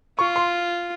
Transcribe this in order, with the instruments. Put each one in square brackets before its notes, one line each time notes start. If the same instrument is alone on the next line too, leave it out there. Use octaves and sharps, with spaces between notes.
[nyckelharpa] F4 [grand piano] C#6
[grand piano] C6